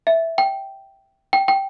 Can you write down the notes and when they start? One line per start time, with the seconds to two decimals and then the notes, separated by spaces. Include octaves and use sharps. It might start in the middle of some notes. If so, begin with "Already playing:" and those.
0.07 E5
0.38 G5
1.33 G5
1.48 G5